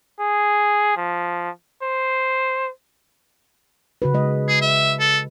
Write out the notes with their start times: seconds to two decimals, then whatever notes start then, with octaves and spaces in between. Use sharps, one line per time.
0.20 G#4
0.97 F3
1.82 C5
4.02 C#3 F#4 B4
4.14 G#3 D#5
4.48 G#4
4.62 E5
5.00 A4